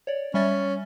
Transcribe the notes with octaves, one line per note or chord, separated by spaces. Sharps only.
C#5 D5
G3 C#4 E5 A6